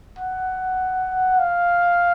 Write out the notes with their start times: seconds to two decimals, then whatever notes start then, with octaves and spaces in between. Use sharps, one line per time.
0.19 F#5
1.39 F5